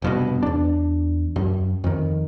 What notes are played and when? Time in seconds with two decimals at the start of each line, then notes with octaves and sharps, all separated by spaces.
0.02 F1 G2 B2
0.43 E2 D4
1.36 F#2
1.84 F2 D#3